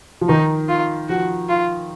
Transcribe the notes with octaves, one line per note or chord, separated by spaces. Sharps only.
F3
D#3 D#4
F4
F3 F#4
F4